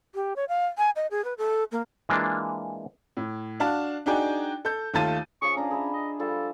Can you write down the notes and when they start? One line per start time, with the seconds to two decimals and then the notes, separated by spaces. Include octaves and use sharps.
0.15 G4
0.36 C#5
0.49 F5
0.78 G#5
0.96 D#5
1.11 G#4
1.24 B4
1.38 A4
1.72 A#3
2.09 E3 G#3 A#3 D4 F4
3.17 A2
3.60 D4 F#4 F5 A5
4.06 D4 D#4 F#4 G#4 D5 G5
4.65 A4 G6
4.94 D#2 A3 F4 A5 A6 D#7
5.42 F3 C#4 G#4 C#6
5.56 C#4 D4 A#5 D6
5.71 G#4 B4 E5
5.93 D#5
6.19 F3 G3 F4 A4